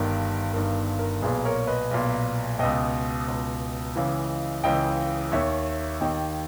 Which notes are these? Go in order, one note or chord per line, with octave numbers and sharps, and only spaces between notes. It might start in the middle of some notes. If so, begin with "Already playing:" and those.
Already playing: G1 G2 D#3 A#4
G1 G2 D#3 A#4
A#4
B1 A#2 G#4 B4
A#4 C#5
B4 D#5
B1 A#2
C#2 B2 D#5 G5
C#2 B2
C#2 C#3 E3
C#2 C#3 E3 D#5 G5
D#2 D#3 C#5 E5
D#2 D#3 D#5 G5